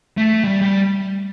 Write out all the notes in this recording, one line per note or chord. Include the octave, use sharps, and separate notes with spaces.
A3
G3
G3